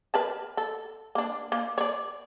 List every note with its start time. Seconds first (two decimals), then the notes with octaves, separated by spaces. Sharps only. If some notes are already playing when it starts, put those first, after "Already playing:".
0.14 A#4 B4 A5
0.57 A4
1.15 A#3 D4
1.52 A#3
1.78 C#5 D5